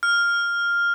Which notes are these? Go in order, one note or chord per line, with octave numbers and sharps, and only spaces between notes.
F6